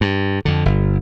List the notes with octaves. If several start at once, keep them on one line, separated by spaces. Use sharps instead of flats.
G2
F2 D3
G1